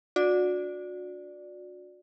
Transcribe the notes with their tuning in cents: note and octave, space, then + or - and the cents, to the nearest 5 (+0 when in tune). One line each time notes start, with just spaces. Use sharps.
D4 +0 F#4 -30 D5 +0